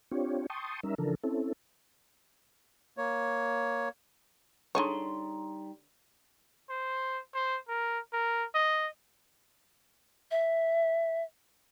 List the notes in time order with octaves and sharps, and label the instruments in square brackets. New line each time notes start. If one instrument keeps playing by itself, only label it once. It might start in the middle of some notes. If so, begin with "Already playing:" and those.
[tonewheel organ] C4 D4 F4 G4 C#5
G5 A5 C6 C#6 D#6
G3 C#4 D#4 A#4 E5
C#3 E3 F3 D4 A4 A#4
C4 C#4 E4 A4
[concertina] A#3 C#5
[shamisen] D3 G#4 C#5 [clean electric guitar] G3 D#4 C6
[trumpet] C5
C5
A#4
A#4
D#5
[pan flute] E5